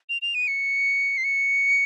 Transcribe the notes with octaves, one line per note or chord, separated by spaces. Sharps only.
F7
F7
D#7
C#7
C7
C#7